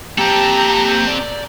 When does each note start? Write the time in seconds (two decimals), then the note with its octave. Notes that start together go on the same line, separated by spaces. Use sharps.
0.18 A#3 C4 G4 A4 A5 A#5
1.07 D5